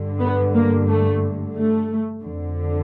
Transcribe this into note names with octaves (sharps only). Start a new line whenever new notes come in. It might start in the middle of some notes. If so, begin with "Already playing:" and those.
Already playing: G2 D3
B3
A#3
A3
A3
F2 D3